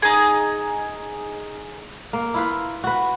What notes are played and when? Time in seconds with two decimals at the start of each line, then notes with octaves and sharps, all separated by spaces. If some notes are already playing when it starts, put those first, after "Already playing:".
0.02 D#4 G#4
2.13 A#3
2.34 E4 F4 B4
2.84 F#4 B4